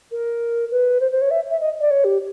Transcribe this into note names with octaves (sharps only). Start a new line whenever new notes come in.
A#4
B4
C5
C5
C#5
E5
E5
D#5
D5
C#5
G4